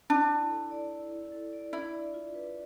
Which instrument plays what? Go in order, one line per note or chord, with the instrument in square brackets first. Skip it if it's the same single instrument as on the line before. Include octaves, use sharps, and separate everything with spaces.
[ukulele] D4 [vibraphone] E4
[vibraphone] E4
A4
D5
E4
E4
A4
D5
[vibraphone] D4 [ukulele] E4
[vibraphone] D5
F4
B4